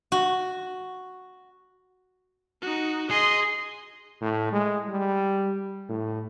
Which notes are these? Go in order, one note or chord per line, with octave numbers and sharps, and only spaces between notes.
F#4
D#4 F#4
G#4 D#5 C6
A2
G#3
G3
A2